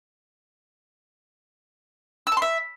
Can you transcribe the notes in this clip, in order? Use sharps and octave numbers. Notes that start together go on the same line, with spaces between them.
E6
A5
C6
E5